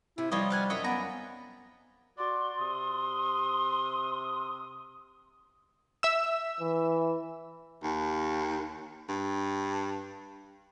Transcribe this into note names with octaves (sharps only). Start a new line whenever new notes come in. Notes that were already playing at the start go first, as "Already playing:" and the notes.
C3 E4
F3 G3 D#4 C5 C#5 D#5
F5 F#5 G#5
F#2 F#3 C#5 D#5 E5
B3 D5 G#5 A#5
F#4 D5 C6
C3 D#6
E5 E6
E3
D#2
G2